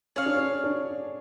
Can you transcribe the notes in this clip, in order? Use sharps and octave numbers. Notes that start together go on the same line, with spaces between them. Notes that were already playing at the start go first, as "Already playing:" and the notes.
C#4 G#4 C#5 F5
D4
C#4
D4